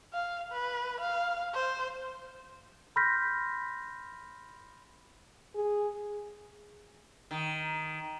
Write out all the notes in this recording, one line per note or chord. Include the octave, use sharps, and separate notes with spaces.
F5
B4
F5
C5
B5 C6 F6 G6 A#6 B6
G#4
D#3